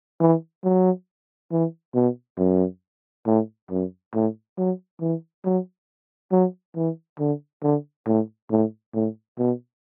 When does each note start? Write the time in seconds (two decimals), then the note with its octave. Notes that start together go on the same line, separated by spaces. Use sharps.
0.21 E3
0.64 F#3
1.52 E3
1.95 B2
2.38 F#2
3.26 A2
3.70 F#2
4.14 A2
4.58 F#3
5.01 E3
5.45 F#3
6.32 F#3
6.76 E3
7.19 D3
7.63 D3
8.06 A2
8.51 A2
8.94 A2
9.38 B2